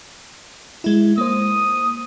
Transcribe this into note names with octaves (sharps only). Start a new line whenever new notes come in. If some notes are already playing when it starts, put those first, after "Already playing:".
G#3 E4
A#3 C5 D#6